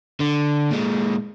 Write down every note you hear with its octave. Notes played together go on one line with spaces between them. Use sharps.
D3
A#2 G#3